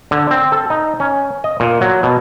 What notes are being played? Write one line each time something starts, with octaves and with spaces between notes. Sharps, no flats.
D3
C4
A4
D#4
C#4
D#5
A#2
F#3
B2